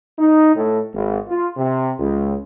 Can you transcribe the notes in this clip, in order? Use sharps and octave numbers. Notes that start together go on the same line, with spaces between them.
D#4
A2
G#1
F4
C3
C#2